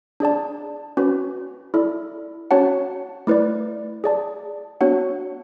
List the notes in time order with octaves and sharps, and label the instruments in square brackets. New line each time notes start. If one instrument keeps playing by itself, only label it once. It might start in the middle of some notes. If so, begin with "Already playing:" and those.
[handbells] D4 G#4 D5 A5
C#4 F#4 B4
E4 A4 D5
C#4 F#4 C#5 F#5 A5
A3 E4 B4 D5
G#4 D5 A5
B3 D4 F#4 C#5 F#5